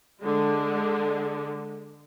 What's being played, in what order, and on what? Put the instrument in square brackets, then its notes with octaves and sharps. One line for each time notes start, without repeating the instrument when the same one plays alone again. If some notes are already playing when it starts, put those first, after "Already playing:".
[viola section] D3 G#3